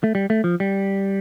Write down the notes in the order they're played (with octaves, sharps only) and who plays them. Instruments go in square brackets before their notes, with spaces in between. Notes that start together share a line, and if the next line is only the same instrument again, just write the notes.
[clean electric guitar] A3
G3
A3
F3
G3